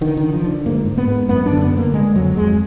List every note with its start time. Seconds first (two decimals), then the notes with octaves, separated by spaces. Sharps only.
0.01 D3 D#3
0.17 D#3
0.23 D3
0.34 F3
0.44 D3
0.66 G#2 A#3
0.87 G#2
0.98 B3
1.08 G#2
1.29 F#2 B3
1.46 D4
1.52 D3
1.61 B3
1.72 D3
1.78 A#3
1.94 D3 G#3
2.15 F2 F#3
2.37 F2 G#3